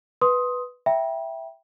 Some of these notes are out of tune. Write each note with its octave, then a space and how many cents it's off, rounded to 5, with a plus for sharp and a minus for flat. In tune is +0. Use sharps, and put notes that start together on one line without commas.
B4 +0 C6 +5 D#6 +10
E5 +0 G5 +0 B5 -45